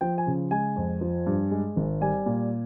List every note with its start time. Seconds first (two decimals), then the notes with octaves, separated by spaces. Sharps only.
0.01 F3 G5
0.18 G#5
0.27 C#3
0.51 G#3 G#5
0.76 F2
1.01 F3
1.26 G2
1.51 G#3
1.76 G#1
2.01 G3 G#5
2.26 A#2